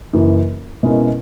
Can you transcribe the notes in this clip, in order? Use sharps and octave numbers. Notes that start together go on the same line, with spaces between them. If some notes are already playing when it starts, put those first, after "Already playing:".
F#1 F#2 E3
B2 G#3 C#4 E4 A#4